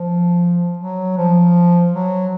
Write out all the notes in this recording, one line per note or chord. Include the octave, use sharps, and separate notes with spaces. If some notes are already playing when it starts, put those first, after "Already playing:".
Already playing: F3
F#3
F3
F#3